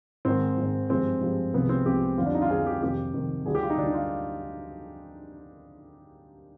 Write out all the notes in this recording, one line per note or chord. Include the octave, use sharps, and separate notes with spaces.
G#2 D#3 G#3 C4
G#2 D#3 G#3
G2 F3 G#3 C4
G2 F3 G#3
C2 C3 F3 G#3 B3
C4
C2 C3 F3 G#3 G4
F2 D3 G3 F4
D4
D#4
F4
F2 D3 G3 G#4
G4
F2 C3 D#3 G4
F2 C3 D#3
D2 D3 G3 G#4
G4
F4
D#4
D2 D3 G3 D4
D#4
F4